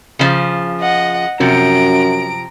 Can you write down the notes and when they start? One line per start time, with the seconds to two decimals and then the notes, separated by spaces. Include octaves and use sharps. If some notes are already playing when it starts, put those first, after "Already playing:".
0.19 C#3 F3
0.80 D#5 F#5
1.40 F#2 C3 F3 A#5 D7